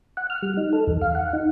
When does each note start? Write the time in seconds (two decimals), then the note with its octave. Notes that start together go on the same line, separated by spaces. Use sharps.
0.17 F#5
0.30 F6
0.42 G3
0.57 D#4
0.73 A4
0.87 E2
1.02 F5
1.15 F#5
1.33 D#4